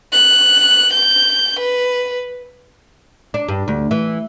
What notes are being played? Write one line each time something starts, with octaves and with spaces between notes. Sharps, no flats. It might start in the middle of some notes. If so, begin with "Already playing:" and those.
F#6
G6
B4
D4
G2
D2
E3